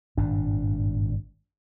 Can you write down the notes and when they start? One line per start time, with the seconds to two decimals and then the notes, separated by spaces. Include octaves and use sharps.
0.17 G#1 G2 A#2 D4